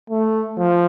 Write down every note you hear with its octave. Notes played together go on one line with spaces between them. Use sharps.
A3
F3